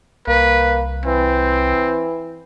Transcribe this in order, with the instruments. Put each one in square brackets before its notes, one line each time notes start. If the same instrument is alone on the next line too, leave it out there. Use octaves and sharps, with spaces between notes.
[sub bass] C2 [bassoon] A#3 [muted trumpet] B4
[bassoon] E3 [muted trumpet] C4